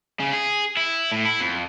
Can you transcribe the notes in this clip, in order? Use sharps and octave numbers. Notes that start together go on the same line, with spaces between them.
C#3
G#4
E4
A2
E4
F2